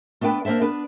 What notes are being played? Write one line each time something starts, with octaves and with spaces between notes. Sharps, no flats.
A3 B3 D4 B4 G5
A#3 D4 C5 E5 A5
B3 D4 B4